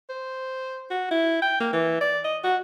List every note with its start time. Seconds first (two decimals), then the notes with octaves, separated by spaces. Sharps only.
0.09 C5
0.90 F#4
1.11 E4
1.42 G5
1.60 A#3
1.73 E3
2.01 D5
2.25 D#5
2.44 F#4